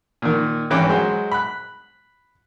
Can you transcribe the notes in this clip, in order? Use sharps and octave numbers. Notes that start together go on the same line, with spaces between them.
A#2 D#3
G#1 E3 C#4 G5 D6 F#6
F#3 G#3 C5
B5 F#6